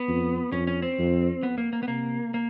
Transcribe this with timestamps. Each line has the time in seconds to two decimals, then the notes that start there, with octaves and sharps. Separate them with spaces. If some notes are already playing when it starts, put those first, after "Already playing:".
Already playing: B3
0.08 F2
0.52 F2 C#4
0.67 C#4
0.82 C4
0.99 F2
1.43 B3
1.58 A#3
1.73 A#3
1.83 B3
1.88 C3 A#3
2.34 A#3